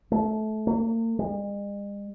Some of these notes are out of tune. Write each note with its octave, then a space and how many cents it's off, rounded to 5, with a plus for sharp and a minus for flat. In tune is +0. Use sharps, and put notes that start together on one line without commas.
A3 -25
A#3 -45
G#3 -45